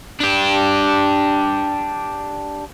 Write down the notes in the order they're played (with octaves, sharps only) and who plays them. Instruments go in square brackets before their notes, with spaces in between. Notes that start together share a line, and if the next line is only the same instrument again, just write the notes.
[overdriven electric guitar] D4 G4